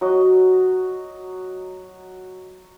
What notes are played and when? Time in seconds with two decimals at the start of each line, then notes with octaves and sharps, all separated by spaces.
0.01 F#3 F#4 D#5